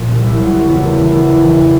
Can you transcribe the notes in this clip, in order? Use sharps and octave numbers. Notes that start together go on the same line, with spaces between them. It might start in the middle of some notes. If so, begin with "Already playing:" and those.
Already playing: A#2 F3
C2
C2 E4
F#3
F4
C#3 F#4
E2
A3 A#4
E3
E2
F1
E3
C3